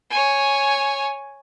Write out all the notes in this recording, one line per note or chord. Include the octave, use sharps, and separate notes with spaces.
C#5 G#5